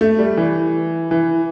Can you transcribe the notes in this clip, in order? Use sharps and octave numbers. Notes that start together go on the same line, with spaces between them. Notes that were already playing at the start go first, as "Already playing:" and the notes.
A3
G3
E3
E3